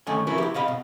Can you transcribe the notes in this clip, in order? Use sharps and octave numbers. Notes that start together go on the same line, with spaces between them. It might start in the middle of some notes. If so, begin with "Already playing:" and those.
D#3 A3 C#4 G#5
F3 C#4 E4 F#4 A#4 B4
E4 G4
B2 D#5 F5 B5
B2